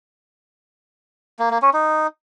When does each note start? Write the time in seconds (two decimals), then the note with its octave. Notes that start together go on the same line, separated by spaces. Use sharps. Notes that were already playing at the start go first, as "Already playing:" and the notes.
1.39 A#3
1.51 A#3
1.62 C#4
1.74 D#4